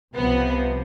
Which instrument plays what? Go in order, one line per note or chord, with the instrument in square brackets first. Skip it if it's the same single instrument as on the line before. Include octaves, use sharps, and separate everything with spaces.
[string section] C2 C3 F3 B3